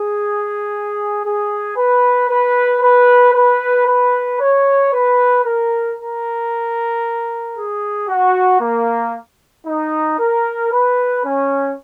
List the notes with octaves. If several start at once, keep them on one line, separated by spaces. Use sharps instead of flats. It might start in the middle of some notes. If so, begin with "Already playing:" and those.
Already playing: G#4
G#4
B4
B4
B4
B4
B4
C#5
B4
A#4
A#4
G#4
F#4
A#3
D#4
A#4
B4
C#4